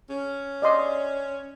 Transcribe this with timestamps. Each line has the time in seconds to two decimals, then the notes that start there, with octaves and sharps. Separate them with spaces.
0.09 C#4
0.62 D5 D#5 C6